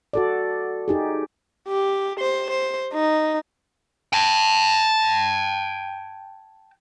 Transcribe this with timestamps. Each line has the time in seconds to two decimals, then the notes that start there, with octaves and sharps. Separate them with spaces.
0.13 F#4 A4 D5
0.88 D#4 G4 G#4
1.68 G4
2.20 C5
2.50 C5
2.93 D#4
4.13 G5 A5